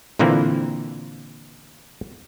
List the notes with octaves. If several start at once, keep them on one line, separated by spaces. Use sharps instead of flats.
A#2 D3 E3 A#3 C4 E4